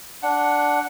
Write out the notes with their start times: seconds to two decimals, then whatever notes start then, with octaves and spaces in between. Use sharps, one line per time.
0.23 D4 F#5